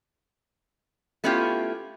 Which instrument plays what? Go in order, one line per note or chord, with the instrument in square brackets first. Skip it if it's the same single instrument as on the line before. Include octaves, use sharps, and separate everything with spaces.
[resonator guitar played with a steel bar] A3 B3 C#4 E4 F4 G4